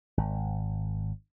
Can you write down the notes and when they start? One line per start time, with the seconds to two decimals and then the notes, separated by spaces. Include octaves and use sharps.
0.17 G#1